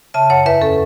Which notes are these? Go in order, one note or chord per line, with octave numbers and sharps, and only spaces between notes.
C#3 E5 A5
F#2 C#5 F#5
E2 B4 E5
C#4 A4